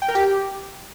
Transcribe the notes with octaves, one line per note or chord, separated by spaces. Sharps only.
G5
A#4
G4